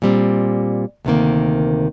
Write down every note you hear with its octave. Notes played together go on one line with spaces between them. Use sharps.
A#2 G3 C4
D2 C3 D#3 A#3